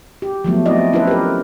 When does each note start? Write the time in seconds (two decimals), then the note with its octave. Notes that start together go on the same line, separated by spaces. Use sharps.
0.22 G4
0.44 F3 F#3 A3 B3
0.66 A3 C4 E4 D5 D#5
0.93 C#4 E4 F4 A4 B4 C5
1.07 G4 A#4